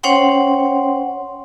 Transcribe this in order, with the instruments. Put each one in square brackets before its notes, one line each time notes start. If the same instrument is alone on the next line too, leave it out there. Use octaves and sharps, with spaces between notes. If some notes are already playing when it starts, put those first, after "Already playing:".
[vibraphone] C#4 C5 C#5 F#5 G5 C6